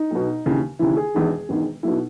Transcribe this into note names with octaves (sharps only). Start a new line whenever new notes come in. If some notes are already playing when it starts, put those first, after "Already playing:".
Already playing: D#4
B1 B2
D#2 C#3 E3
D#2 C#3 E3 E4
G#4
E1 E2 D#3
E1 E2 D#3
B1 B2 E4